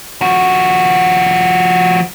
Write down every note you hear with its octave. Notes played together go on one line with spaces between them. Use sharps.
F3 F#4